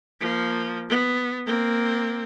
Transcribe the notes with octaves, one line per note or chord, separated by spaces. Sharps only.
F3 A#3
B3
A#3 C4